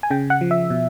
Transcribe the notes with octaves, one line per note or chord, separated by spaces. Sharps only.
G#5
C#3 G5
F#5
F3
E5
B2